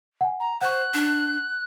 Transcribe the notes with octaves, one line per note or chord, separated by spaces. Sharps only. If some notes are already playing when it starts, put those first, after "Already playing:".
F#5 G#5
A#5
C5 F#5 C#6 F#6
D4